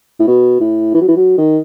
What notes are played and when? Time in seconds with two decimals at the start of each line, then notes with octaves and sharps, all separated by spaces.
0.20 A2
0.28 B2
0.61 A2
0.95 E3
1.01 F#3
1.08 E3
1.17 F#3
1.38 D#3